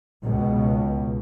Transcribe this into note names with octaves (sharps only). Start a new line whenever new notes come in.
C#2 B2